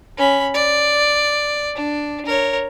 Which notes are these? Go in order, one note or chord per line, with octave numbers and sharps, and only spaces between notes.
C#4 B5
D5
D4
A#4 C#5